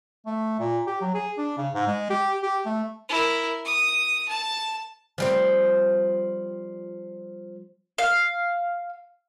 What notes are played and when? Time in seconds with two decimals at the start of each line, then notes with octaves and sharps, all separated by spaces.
0.26 A3
0.59 A#2
0.87 G4
1.01 F#3
1.14 G#4
1.37 D4
1.57 C#3
1.73 G#2
1.87 G#3
2.10 G4
2.43 G4
2.66 A3
3.09 E4 A#4
3.65 D#6
4.28 A5
5.18 F3 G3 C4
7.98 F5